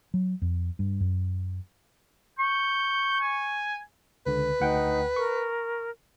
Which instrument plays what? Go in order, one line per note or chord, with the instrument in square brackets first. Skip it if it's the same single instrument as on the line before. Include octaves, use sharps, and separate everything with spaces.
[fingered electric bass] F#3
F2
G2
F#2
[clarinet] C#6 [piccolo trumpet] G6
[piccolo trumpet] G#5
[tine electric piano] C#2 D3 [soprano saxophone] B4
[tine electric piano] D2 F#5 G5 [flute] D#4
[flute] A#4 [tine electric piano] C#6